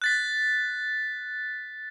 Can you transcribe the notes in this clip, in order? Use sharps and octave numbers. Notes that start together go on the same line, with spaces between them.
F#6 A6 B6